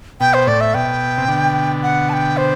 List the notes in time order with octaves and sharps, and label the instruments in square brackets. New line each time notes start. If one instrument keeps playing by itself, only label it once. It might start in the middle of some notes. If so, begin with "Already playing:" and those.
[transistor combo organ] B2 [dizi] G5
[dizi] C5
[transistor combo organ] A2 [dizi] D5
[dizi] E5
[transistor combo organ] B2 [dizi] G5
[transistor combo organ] C3
B2 D3
[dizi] F#5
A5
G5
C5